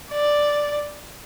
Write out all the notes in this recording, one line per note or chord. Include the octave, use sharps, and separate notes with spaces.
D5